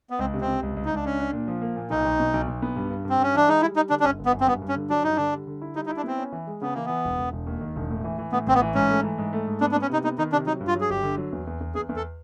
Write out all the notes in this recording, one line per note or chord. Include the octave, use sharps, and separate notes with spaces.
B3
C#2 C4
C3
C4
C3
C#2
C#2
D#4
C#2 D4
C#4 D4
D4
A#2
F3
A#3
A#2
B1 D#4
B1
B2
B1
B1
B3
G2
G2
G2
C4
G2 C#4
E3 D4
G#3 D#4
G3 E4
G3 D#4
D3 D4
D4
G1 C#4
G1
B3
F#2
C4
G2 B3
G2
C#4
D3
F#3 D4
G2 D#4
D3 D4
G3
D3
E4
G3 D#4
D#4
E4
D4
B3 C4
C#4
E3
G#3
C#3 B3
E3 A#3
E3 B3
E1
E1
E1
D#2
D#3
E1
A2
E3
E3
A2 B3
A1 C4
B3
E3
G#2 C#4
A3
E3
G#2
A3
G#2
B3 D4
D4
B3
C#4
C3 D#4
B3 D#4
D#3 D#4
C3 D4
F#3 D#4
G2
F4
F#3
G#4
G1 G4
D3
F#3
E2
E2
E2
E2 G#4
E2
A4